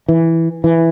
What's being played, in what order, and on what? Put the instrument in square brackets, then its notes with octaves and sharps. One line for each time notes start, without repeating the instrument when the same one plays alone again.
[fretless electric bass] E3
E3